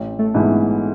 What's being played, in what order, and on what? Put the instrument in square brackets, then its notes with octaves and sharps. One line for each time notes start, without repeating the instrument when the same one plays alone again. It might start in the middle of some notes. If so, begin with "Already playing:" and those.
Already playing: [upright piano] A1
[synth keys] A3
[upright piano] G#2 E3 B3 E4